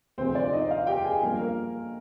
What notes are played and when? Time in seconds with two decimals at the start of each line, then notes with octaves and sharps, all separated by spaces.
0.18 D2 C3 F3 G#3 C4 C5
0.35 D4 D5
0.52 D#4 D#5
0.71 F4 F5
0.87 G4 G5
1.04 G#4 G#5
1.22 G2 F3 G#3 A#3 A#4
1.39 A#3 A#4